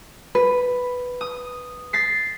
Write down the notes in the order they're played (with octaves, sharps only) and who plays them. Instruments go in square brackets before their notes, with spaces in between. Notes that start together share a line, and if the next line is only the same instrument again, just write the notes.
[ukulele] B4
[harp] D#6
A6 B6 C7